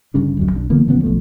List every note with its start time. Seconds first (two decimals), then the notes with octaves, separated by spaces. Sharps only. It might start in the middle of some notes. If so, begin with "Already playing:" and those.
0.14 G1 G2 C#3 D4
0.37 D1 F#2 F#3
0.52 B1 D4
0.70 D3 F3 A#3 B3
0.87 A1 C#3 F3 B3
1.03 B1 B2 F3 A3